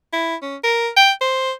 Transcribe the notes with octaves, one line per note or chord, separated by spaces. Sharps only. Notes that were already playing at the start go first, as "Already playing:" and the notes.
E4
C#4
A#4
G5
C5